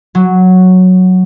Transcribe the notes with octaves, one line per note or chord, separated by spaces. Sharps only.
F#3